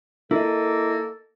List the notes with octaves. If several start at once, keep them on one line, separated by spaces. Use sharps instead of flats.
A#3 E4 A4 D#5